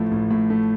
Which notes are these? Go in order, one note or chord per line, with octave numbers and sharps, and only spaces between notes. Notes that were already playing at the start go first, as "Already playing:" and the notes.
Already playing: A1 A2 F3 A3
A1
A2
A3